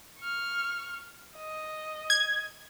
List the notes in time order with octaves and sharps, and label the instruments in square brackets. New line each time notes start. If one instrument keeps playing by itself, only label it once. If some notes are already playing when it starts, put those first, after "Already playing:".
[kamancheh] C#6 F6
D#5
[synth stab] G#6